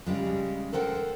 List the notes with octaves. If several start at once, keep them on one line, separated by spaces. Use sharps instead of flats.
C#3 G3 G#3
A4 A#4 C5 F#5 G5